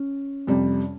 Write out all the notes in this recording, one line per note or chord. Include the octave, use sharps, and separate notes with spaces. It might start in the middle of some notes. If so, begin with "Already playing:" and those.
Already playing: C#4
F2 C3 G3